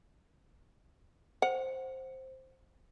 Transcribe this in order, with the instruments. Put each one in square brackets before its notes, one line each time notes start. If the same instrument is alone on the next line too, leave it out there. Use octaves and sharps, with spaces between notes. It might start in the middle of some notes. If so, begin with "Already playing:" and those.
[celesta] C5 [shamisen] F#5